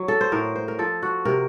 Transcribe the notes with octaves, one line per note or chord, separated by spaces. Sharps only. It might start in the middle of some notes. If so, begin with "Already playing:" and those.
Already playing: F#3
A4
C5
A2 A#4
C5
A#4
F3 A4
F#4
C3 A#4